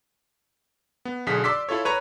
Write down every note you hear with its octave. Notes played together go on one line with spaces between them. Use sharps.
B3
B1 D3 G#4 B6
D5 C6 D6 E6 B6
E4 F4 A4 C#5
B4 C#5 A#5